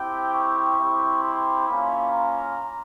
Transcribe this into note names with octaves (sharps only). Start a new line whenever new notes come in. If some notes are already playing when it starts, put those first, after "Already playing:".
Already playing: C4 E4 G4 G5
C#6
C4 E4 G4
C6
A#3 C#4 F4 B5
A#5